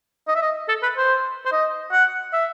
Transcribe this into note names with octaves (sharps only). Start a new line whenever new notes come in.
D#5
E5
D#5
A4
B4
C5
C5
D#5
F#5
E5